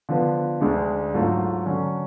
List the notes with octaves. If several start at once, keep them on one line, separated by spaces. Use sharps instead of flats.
D3 F3 B3
D2 D3 G#3 D4
G#2 F#3 A3 F4
D3 F#3 C#4